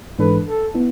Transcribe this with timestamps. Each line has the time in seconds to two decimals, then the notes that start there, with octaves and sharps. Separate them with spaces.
0.19 G#2 E3 G#3 D4 A4 B4
0.47 A4
0.75 B3 E4